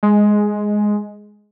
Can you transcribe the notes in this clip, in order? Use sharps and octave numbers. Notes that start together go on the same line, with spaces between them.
G#3